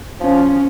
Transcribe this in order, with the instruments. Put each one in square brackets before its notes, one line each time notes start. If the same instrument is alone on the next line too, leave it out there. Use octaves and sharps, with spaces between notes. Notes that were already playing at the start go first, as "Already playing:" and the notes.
[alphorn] F3 [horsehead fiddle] C#4